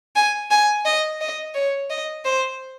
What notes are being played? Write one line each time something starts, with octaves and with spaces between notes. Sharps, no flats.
G#5
G#5
D#5
D#5
C#5
D#5
C5